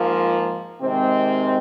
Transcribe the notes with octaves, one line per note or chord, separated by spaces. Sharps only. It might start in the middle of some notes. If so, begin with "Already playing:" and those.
Already playing: G#2 F3 A#3 F4
C3 D#3 G#3 C4